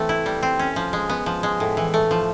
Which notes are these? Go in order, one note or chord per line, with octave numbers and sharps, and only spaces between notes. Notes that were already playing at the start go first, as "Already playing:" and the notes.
Already playing: E3 A3 C4
E4
G3
C4
C#4
F3
G#3
B3
F3
G#3
A2
E3
A3
F3